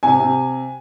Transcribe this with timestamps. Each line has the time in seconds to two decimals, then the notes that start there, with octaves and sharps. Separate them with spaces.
0.03 C3 G#5
0.20 C3